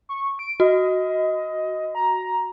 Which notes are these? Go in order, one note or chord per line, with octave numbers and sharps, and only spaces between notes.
C#6
D7
F#4 D#5
A#5